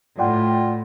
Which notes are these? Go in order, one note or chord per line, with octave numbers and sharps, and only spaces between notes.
A2 F4 D5 F#5 G5